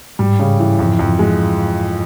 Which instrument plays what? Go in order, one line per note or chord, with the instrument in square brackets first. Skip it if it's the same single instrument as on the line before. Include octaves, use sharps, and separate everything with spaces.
[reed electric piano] G#2 [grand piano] G3
[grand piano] C#3
E3
F2
F2
G#3